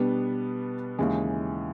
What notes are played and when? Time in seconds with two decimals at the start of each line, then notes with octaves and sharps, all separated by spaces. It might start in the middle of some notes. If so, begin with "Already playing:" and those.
Already playing: B2 G3 B3 D4
0.99 D#2 C#3 E3 G#3